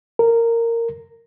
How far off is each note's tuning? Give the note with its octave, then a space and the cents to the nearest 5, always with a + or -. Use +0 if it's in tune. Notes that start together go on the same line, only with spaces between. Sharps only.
A#4 -15